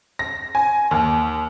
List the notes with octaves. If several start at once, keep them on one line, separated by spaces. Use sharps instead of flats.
A#6
G#5
D#2